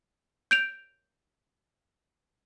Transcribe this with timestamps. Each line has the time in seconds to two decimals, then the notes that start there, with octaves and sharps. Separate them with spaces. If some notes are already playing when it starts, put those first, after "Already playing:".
0.51 G6 D7 F7